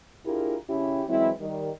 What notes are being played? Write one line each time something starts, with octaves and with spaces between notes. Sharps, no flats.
D4 E4 F4 G4 G#4 A#4
C#3 C#4 E4 G4
E3 F#3 G#3 C4 E4
D#3 G3